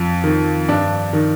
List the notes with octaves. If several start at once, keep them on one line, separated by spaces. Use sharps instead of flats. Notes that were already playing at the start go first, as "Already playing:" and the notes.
Already playing: F2
D#3
G2 D4
D#3